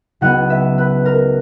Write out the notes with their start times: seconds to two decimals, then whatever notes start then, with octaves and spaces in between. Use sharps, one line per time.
0.21 C#2 C#3 F#3 B3 D#4 F#5
0.50 E5
0.78 B4
1.05 A#4